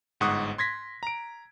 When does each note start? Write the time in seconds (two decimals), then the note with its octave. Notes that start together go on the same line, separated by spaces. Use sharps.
0.20 G1 G#2 F#5 C#6 D#6 F#6
0.58 C6 G#6 A#6 B6
1.03 A#5 D7